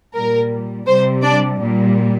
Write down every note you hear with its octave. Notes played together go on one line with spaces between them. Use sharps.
A#2 G3 A#4
C3 G3 C5
D4 D5
A#2 G3